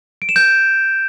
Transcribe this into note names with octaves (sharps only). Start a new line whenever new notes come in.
D7
E7
G6